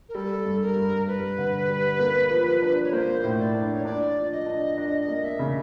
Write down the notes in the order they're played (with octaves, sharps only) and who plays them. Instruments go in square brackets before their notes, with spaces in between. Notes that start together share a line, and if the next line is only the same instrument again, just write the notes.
[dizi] A#4
[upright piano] G3 [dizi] A4
[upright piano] G2
[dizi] A#4
[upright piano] G2
[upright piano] G2 [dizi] B4
[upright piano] D3
G3
A#3
F3
D4
[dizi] C#5
[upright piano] A#3 [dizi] C5
[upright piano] A2
[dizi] D5
[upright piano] D4
[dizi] C#5
[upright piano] D4 [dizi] D5
[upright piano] F3
[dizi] D#5
[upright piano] D4
[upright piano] D4 [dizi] D#5
[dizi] D#5
[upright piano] A#3
[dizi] E5
[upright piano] C#3